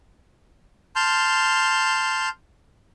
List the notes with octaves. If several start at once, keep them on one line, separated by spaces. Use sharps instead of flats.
A5 C6 F6 G6